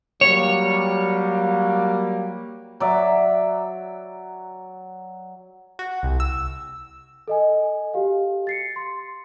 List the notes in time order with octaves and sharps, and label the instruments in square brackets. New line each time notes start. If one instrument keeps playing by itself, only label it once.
[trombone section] F#3 G3 A#3 [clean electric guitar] C#5
[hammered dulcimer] F#3 D5 E5
[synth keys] F#4
C2
E6
[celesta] A4 D#5 G#5
F#4 G4 F5
A6 C7 C#7
C6